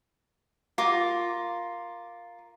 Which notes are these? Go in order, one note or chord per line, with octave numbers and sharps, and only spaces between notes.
F4 A#4 D6